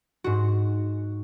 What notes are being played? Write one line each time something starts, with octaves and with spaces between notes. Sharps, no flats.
G#2 F#4